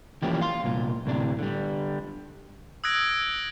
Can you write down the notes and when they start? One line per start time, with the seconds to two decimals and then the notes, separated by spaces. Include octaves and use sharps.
0.22 E3 F3 G3 A#3 C#4 G4
0.41 F5 C6
0.64 C2 A#2
1.06 D2 A2 C3 D4
1.39 D3 G3
2.84 D#6 E6 F#6 G#6 A#6 D7